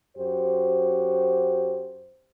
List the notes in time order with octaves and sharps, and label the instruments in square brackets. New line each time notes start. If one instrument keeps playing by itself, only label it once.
[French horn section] F#2 F#4 G4 C5